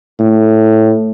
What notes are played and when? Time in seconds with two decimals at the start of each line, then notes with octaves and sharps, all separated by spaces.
0.19 A2